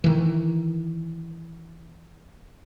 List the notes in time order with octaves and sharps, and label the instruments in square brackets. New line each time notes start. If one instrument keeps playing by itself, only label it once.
[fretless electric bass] D#3 E3